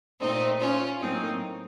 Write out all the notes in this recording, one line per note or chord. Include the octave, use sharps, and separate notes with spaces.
A#2 A3 C4 D#4
C#4 F4
A2 F#3 A#3 C4 D#4